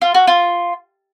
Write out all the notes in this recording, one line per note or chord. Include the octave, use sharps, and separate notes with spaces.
F4
F#4
F4